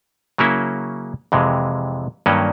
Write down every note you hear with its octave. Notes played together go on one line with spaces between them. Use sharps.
C#3 F#3 A#3 C#4 E4
F2 C3 E3 G#3
G2 D#3 F#3 A#3 C#4